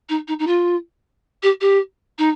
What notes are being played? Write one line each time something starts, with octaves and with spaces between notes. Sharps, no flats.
D#4
D#4
D#4
F4
G4
G4
D#4